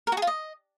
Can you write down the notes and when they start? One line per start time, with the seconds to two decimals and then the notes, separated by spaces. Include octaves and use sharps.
0.07 A#4
0.12 F#4
0.17 G#4
0.22 F4
0.27 D#5